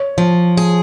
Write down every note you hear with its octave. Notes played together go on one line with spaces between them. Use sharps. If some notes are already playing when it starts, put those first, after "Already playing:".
Already playing: C#5
F3
G#4